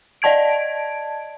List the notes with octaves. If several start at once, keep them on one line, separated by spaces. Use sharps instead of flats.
D5 D#5 A5 G#6 D7